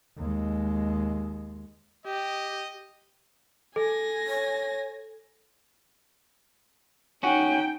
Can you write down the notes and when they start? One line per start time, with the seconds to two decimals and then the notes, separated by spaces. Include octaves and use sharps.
0.18 D#2 G#3
2.06 G4 D#5
3.76 A4 G#5 A#6
4.27 C#5
7.23 C#4 D#4 F#4 G5